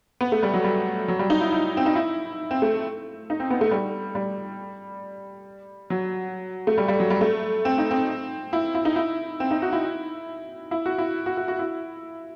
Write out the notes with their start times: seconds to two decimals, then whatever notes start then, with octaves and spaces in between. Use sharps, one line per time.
0.21 B3
0.32 A3
0.43 G3
0.54 F#3
0.64 G3
1.08 F#3
1.19 G3
1.30 D#4
1.41 E4
1.52 E4
1.77 C4
1.86 D#4
1.95 E4
2.51 C4
2.62 A3
3.30 D#4
3.40 C4
3.50 B3
3.61 A3
3.71 G3
4.15 G3
5.90 F#3
6.67 A3
6.78 G3
6.88 G3
7.00 F#3
7.10 G3
7.21 A3
7.65 C4
7.78 D#4
7.91 C4
8.53 E4
8.75 E4
8.85 D#4
8.96 E4
9.40 C4
9.51 D#4
9.62 F#4
9.73 E4
10.71 E4
10.86 F#4
10.98 E4
11.26 F#4
11.37 F#4
11.48 F#4
11.59 E4